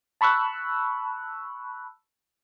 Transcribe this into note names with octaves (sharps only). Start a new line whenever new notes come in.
A5 B5 C#6 E6 F#6